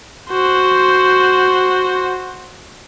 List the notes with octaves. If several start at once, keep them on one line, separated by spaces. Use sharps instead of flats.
F#4 C5